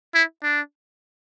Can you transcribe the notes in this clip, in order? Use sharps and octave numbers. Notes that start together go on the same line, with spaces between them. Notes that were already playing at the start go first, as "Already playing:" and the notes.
E4
D4